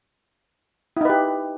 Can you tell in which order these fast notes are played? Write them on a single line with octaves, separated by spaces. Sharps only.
E4 D#4 B4 G4